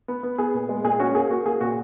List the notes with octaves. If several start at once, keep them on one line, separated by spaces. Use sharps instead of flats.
B3
B3
B3 G#4
A#2
G#3
A#2 G#4
C#4 F#4
A#3 G#4
A#3 F#4
A#3 G#4
A#2 F#4